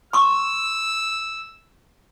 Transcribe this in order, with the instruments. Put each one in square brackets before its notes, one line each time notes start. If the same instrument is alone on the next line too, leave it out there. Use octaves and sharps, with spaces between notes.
[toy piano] C6 C#6 [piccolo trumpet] E6